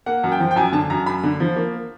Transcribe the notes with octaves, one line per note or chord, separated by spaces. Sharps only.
A#3 F#5
F#2
G5
F3
G5
F#2 G#5
D3 A5
F#2 A#5
F#2 B5
D3
F3
A#3